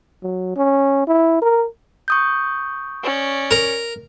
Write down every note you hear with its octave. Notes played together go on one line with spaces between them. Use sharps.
F#3
C#4
E4
A#4
C#6 D#6 G6
C#4 D5
A#4